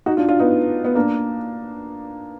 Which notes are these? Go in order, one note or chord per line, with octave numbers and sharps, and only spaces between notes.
D#4 F#4
D4 F4
D4 F4
B3 D#4
B3
A#3 D4